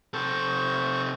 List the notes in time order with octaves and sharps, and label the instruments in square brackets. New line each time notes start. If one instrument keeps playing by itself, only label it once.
[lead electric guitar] C3 A4 [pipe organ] C5 C#6